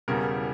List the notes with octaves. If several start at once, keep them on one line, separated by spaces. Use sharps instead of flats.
E1 E2 C#3 G3 A#4